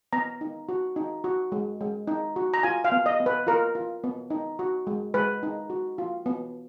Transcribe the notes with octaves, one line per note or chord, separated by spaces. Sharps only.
B3 A#5
D#4
F#4
D#4
F#4
G#3
G#3
D#4
F#4
A#5
F4 G#5
F5
B3
D#5
B3
B4
F4 A#4
F4
B3
D#4
F#4
G#3
G#3 B4
D#4
F#4
F4
B3